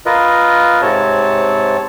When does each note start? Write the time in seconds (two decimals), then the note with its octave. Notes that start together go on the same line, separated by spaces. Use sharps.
0.06 F4 A#4 B4 D#5
0.82 G#2 C3 C4 C#5 A5